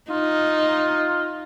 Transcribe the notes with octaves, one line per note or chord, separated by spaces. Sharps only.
D#4 F4